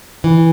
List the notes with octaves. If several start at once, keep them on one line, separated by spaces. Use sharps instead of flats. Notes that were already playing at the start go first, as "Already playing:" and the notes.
E3